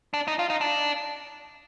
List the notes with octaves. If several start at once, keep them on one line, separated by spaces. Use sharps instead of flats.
D4
D#4
F4
D#4
D4